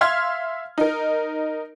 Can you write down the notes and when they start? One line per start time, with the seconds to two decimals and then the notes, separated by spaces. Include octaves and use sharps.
0.01 E5 F5 C6 F6 G#6
0.78 D#4 A#4